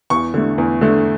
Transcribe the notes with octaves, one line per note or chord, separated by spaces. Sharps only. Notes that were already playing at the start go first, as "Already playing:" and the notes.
E2 C#6
D3 A3
E2
D3 A3